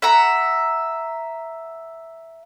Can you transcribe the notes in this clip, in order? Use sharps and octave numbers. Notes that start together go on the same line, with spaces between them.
E5 F#5 A#5